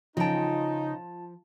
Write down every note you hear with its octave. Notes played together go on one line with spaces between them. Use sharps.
C#3 F3 D#4 F4 G5 A5